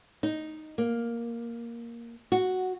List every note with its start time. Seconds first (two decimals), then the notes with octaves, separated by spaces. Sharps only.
0.23 D#4
0.78 A#3
2.32 F#4